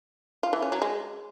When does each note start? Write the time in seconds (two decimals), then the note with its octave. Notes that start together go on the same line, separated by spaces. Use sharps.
0.43 F4
0.53 E3
0.62 C#4
0.72 F#3
0.82 G#3